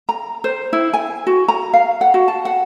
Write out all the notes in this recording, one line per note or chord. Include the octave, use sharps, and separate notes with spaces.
A#5
C5
E4
G#5
F#4
A#5
F5
F#5
F#4
A5
F#5